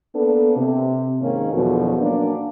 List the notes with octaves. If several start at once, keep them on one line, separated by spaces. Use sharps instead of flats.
A#3 B3 D4 A4
C3
G#2 D#3 A#3 C#4
E2 B2 D3 F3 F#3
F#3 A#3 C#4 D4